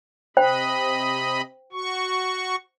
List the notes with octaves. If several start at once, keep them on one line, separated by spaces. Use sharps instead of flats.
C3 C5 D#5 G5 B5
F#4 C#6